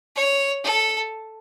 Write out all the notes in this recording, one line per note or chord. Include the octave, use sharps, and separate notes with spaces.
C#5
A4